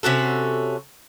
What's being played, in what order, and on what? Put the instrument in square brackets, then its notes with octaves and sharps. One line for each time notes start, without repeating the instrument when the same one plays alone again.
[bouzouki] C3 C#4 F#4 A4